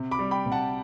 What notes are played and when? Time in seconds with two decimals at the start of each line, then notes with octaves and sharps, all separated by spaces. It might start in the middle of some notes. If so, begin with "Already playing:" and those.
Already playing: C3
0.11 B5 D6
0.19 G3
0.31 G5 B5
0.46 C3
0.52 F#5 A5